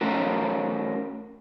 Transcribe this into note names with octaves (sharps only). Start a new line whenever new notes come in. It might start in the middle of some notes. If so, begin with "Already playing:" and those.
A3 C#4 F#4 A#4